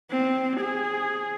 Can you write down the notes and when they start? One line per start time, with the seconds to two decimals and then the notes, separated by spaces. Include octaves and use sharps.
0.10 C4
0.60 G#4